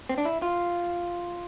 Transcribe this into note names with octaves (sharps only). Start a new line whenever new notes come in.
C4
D4
E4
F4